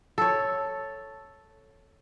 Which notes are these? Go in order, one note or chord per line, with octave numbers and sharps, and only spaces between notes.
A4 C#5